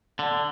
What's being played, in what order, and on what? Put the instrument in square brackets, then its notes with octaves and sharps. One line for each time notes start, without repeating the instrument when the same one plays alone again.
[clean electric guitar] D3